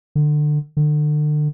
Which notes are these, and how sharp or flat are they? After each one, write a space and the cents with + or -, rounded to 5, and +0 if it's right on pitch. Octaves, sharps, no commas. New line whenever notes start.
D3 +25
D3 +35